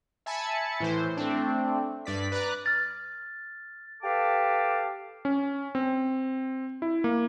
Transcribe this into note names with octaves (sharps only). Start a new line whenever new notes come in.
E5 G#5 A5 B5 A6 C#7
A2 E3 C5
A3 C4 D4
G2 D5 B6
B4 D5 A#5 D6 F#6
F6 A6
G4 A4 B4 F5 A5 D6
C#4
C4
E4
A#3